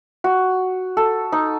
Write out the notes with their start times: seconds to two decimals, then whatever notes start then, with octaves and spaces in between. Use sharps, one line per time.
0.24 F#4
0.97 A4
1.32 D#4